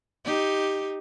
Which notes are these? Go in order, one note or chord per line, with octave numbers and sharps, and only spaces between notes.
D#4 G4